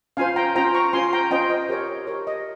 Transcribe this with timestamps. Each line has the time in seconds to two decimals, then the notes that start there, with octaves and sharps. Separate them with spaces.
0.17 C#4 F4 C5 F5 G#5
0.36 G5 A#5
0.56 C#4 F4 C5 G5 A#5
0.75 A#5 C#6
0.93 C#4 F4 C5 G#5 C6
1.13 G5 A#5
1.31 C#4 F4 C5 D#5 G5
1.50 D#5
1.69 G4 A#4 C#5
2.07 G4 A#4 C#5
2.27 D#5